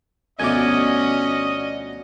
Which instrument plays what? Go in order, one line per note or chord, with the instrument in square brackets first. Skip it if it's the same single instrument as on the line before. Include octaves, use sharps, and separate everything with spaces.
[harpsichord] D2 B2 F3 [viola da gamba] C#4 [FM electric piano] D5 G#5 [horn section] D#5